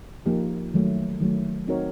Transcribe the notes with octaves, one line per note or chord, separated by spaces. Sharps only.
F3 A#3 D#4 G4
D#3 F#3 A3
D#3 F#3 A3
C4 D#4 F#4 A#4 C#5